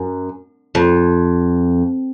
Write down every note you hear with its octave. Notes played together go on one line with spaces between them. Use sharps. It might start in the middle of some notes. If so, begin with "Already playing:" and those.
Already playing: F#2
F2